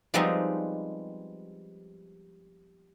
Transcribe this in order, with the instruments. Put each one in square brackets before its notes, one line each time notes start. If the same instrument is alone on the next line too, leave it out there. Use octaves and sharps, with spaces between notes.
[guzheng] F3 G3 G#3 B3 C4 D#4